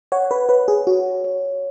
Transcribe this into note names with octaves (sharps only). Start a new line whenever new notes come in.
C#5 F#5
B4
B4 C#5
G#4
F#4 C#5
C#5